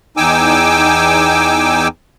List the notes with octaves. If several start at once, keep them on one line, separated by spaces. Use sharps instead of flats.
E2 D#4 G5 G#5 D6 E6